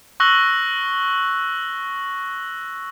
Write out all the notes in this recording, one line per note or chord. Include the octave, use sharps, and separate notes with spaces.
C#6 E6 F#6 A#6 F#7 G7